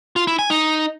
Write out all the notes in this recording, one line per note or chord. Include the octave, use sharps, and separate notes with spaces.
F4
E4
G#5
D#4